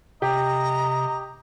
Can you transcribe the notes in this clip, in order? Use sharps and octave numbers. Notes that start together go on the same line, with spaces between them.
C3 G4 D#5 A#5